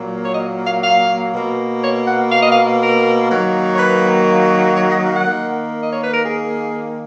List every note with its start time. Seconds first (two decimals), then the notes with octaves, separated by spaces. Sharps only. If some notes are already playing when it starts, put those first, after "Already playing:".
Already playing: A#2 F#3 A#3
0.25 C#5
0.35 D#5
0.67 F5
0.84 F5
1.33 B2 A#3
1.83 C#5
2.08 F#5
2.31 F5
2.42 D#5
2.52 F5
2.81 A#4
3.30 D#3 F#3 A#3
3.74 C#5
3.79 B4
4.77 C#5
4.90 D#5
5.02 F5
5.15 F#5
5.27 D#3 A#3
5.83 D#5
5.92 C#5
6.04 B4
6.14 A#4
6.25 G#4